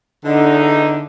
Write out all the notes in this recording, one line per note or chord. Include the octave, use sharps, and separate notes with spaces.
E2 D3 D#4